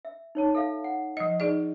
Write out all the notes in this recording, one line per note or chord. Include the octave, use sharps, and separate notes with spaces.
E5
D#4 C#5 A5
A4 E5 F5
F#5
F3 D#5
D#4 G#4 D5